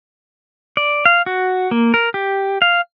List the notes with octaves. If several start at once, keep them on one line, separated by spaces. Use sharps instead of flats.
D5
F5
F#4
A#3
A#4
G4
F5